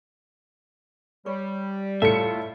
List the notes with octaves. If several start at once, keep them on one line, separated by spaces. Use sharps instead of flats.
G3 C#5
A2 F4 A4 E5 C#7